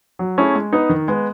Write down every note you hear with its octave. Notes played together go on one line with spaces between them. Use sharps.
F#3
A3 C#4 E4 G#4
G#3
B3 D#4
D#3
G#3 B3